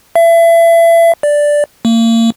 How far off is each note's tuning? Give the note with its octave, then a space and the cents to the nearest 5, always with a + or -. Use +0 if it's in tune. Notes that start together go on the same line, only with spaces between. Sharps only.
E5 +30
D5 +0
A#3 -35